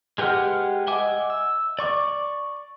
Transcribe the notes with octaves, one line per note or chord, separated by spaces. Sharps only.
G#3 G4 B4 F#5 F6
D#5 E5 F#5 G#5 D6
E6
D5 C#6 D6